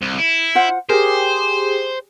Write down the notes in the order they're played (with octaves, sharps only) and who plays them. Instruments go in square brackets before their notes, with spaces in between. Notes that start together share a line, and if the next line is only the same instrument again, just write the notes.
[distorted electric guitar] C2
E4
[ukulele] F4 C5 F#5
[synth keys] G4 G#4 [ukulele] A#4 [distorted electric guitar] C5